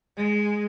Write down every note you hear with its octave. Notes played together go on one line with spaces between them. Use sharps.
G#3